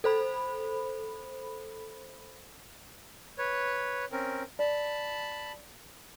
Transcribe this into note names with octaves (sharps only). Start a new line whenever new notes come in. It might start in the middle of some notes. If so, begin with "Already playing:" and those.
A4 C5 B5
B4 C#5
C4 C#4 A#4
D5 A5 B5